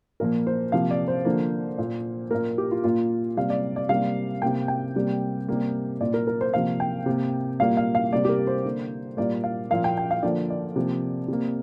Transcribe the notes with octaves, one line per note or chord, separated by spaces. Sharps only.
A#2 F3 A#3 A#4
C5
C3 F3 A#3 F5
D5
C5
D3 F3 A#3
A#2 A#3
A#2 A#3 A#4
G4
F4
A#2 A#3 F4
C3 G3 A#3 F5
D5
D5
C3 G3 A#3 F5
C3 A#3 G5
G5
C3 G3 A#3
C3 G3 A#3
A#2 A#3 D5
A#4
A#4
C5
C3 F3 A#3 F5
G5
C3 A#3
A#2 G3 A#3 F5
F5
F5
C3 G3 A#3 D5
G4
A#4
C5
D3 A#3
A#2 G3 A#3 D5
F5
A#2 F3 A#3 F5
G5
G5
F5
D3 F3 A#3 D5
D5
C3 F3 A#3
C3 A#3